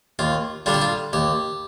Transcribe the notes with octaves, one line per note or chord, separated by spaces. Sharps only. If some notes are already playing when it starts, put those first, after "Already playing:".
D#2 F4
D3 G3 D4 F4
G4
F4
D#2 G4